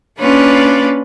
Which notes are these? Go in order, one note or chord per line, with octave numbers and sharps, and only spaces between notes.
A#3 C#4 D4 F4 B4